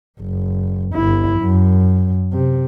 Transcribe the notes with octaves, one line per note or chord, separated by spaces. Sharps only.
F#1
G1 E4
F#2
C3